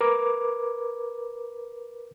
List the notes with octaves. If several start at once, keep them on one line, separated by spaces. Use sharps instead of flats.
A#4 B4 D6